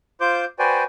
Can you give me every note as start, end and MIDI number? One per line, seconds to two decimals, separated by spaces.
0.21 0.45 65
0.21 0.45 72
0.21 0.45 86
0.21 0.45 91
0.59 0.84 66
0.59 0.84 71
0.59 0.84 72
0.59 0.84 74
0.59 0.84 79
0.59 0.84 80